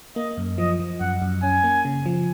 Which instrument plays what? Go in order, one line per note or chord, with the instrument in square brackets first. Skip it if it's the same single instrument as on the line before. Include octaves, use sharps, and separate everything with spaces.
[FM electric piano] A#3 [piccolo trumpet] D#5
[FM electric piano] F#2
[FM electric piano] F3 [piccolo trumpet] D#5
[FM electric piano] F3
[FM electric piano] F#2 [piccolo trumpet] F#5
[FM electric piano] F#2
[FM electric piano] C#4 [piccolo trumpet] G#5
[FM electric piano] A#3
C#3
F3